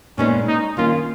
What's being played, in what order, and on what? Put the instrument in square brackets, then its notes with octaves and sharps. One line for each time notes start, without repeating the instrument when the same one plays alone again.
[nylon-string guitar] A#2 G#3 B3 D#4 [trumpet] C#4
[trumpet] D#4
[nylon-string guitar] D#3 A#3 C#4 [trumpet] F4